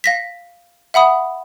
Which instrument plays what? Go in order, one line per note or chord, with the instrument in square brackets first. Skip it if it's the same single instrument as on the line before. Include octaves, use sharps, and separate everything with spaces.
[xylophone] F5 A#6 B6
E5 F#5 B5 D#6